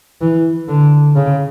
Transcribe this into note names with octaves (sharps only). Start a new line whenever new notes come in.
E3
D3
C#3